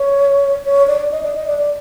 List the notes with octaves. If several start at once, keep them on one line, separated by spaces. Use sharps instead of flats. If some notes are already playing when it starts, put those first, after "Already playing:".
Already playing: C#5
C#5
D5
D#5
D5
D#5
D5
D5